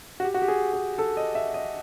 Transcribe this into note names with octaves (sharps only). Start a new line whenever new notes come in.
F#4
G4
F#4
G4
G#4
G#4
A4
D#5
E5
D#5